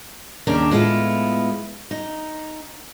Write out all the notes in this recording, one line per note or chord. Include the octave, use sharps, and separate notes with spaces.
D#2 C#3 G3 D4 A#4 G5
A2 G#3 B3 E4 F4
D#4